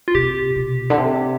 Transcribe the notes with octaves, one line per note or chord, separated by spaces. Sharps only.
F4
C3 G4
B2
D3
C3